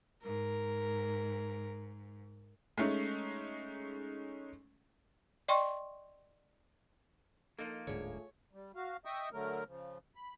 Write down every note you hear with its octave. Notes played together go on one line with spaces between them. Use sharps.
G#2 A#4
G#3 A3 C#4 D#4
D5 D#5 G5 C6 C#6
F3 A#3 D#4 A4
D1 G#2 D3 A3 F4 G#4 C#5
G3
F#4 F5
D#5 E5 G5 C#6 D#6
D3 F#3 A3 A#4
C#3 F3
B5